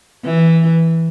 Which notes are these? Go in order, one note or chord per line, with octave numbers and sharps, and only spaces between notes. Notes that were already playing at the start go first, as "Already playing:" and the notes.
E3